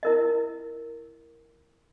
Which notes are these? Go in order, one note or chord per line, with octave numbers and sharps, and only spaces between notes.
E4 A#4 D#5